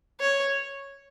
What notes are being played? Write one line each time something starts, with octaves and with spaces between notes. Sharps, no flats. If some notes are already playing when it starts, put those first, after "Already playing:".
C#5